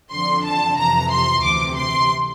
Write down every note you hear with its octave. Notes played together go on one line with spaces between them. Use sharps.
F2 D3 F3 C6
A5
F2 C3 E3 A#5
C6
D2 C3 E3 D6
C6